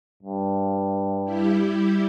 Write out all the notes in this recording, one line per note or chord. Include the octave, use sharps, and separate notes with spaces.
G2
G3 E4 G4